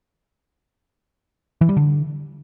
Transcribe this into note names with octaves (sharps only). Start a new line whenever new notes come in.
E3
G3
D3